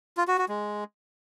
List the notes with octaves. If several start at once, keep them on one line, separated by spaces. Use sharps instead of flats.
F4
F#4
F#4
G#3